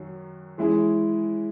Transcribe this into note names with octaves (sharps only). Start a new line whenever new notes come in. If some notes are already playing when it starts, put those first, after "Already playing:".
Already playing: F#2 D#3 F#3
E3 G#3 C#4 E4 G#4